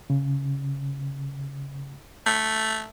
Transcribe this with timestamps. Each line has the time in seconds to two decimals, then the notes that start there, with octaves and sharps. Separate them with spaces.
0.10 C#3
2.26 A3